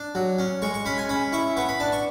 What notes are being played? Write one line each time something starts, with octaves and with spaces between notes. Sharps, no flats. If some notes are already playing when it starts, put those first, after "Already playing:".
Already playing: D4
F#3
C#4
G#3 C#6
C#6
C#4 B5
G#5
C#4 B5
E4 C#6
B3 C#6
B5
D4 A5
C#6